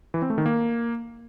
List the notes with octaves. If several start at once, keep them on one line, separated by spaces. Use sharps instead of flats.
E3
C4
A3
D#3
A#3